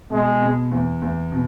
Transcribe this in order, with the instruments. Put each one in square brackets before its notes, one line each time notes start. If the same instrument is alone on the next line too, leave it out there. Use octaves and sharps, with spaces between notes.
[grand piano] B2 [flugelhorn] G#3
[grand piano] B2
E2
E2
B2